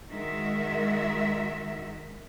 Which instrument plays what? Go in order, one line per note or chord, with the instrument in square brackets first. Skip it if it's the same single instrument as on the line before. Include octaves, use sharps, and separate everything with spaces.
[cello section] D#3 G#3 F#4 A#4 E5